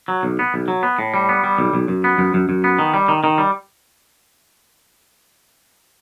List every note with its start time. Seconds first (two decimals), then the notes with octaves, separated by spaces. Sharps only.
0.08 F#3
0.23 B1
0.39 B3
0.54 B1
0.68 F#3
0.83 B3
0.99 A2
1.14 G3
1.29 B3
1.44 G3
1.59 B1
1.74 B1
1.88 F#2
2.04 B3
2.18 F#2
2.34 F#2
2.49 F#2
2.64 B3
2.79 D#3
2.94 G3
3.08 D#3
3.24 D#3
3.38 G3